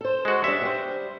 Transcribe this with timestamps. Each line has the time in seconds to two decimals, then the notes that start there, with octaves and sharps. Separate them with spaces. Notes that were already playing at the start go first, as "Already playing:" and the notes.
0.01 A4 C5
0.25 G#3 F#4
0.44 G3 D4 E5
0.62 G3 C5